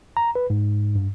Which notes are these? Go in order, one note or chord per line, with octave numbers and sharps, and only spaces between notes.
A#5
B4
G#2
G2